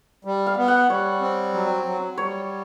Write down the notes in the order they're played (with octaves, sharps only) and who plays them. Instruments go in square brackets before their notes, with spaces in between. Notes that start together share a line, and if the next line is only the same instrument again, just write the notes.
[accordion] G3
[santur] F5
[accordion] B3
[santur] F#5
[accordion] G3 [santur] C#5
[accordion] C4
F#3
F#3
[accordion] G3 [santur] C#5